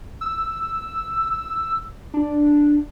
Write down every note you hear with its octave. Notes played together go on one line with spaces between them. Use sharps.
E6
D4